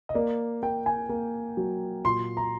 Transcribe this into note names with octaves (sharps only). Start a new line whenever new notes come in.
D#5
A#3 D5
A#3 G5
G#5
A#3
F#3
A#2 C6
A#5